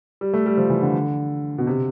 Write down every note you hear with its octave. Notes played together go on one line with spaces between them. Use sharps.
G3
A3
G3
F3
E3
D3
B2
C3